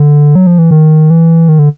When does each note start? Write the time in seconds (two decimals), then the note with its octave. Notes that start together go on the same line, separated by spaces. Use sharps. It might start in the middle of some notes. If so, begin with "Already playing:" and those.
Already playing: D3
0.35 F#3
0.47 F3
0.58 E3
0.71 D#3
1.10 E3
1.49 D#3
1.59 D3